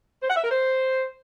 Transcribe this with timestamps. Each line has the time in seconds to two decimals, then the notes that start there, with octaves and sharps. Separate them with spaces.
0.22 C5
0.29 F#5
0.36 E5
0.43 A#4
0.51 C5